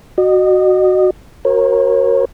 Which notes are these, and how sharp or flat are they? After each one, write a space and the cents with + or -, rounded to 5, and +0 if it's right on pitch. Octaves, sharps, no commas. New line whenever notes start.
F#4 +5 D#5 -30
F#4 +0 A#4 +10 C#5 -35